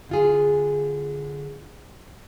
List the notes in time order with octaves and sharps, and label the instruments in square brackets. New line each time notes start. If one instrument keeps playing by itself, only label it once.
[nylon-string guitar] D3 F4 G#4